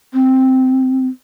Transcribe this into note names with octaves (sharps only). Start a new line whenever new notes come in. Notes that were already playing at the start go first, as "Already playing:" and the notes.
C4